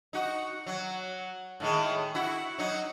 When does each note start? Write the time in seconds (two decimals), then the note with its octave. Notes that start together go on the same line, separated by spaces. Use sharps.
0.13 D#4 F#4
0.66 F#3
1.60 A2 D#3 G#3
2.15 E4 F#4
2.58 F#3 D#4